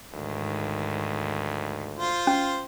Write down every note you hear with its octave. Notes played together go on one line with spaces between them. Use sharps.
D2 G#2 D#3
F4 C5
C#4